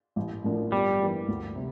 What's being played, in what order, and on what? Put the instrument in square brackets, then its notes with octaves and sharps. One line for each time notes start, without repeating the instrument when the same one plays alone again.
[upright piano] A1
A2 F3 A#3 D4
[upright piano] G1 [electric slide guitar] G3
[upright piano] G2 E3 A#3
D2
C3